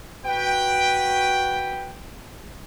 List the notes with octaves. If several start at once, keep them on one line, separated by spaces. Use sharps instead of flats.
F#4 B4 G5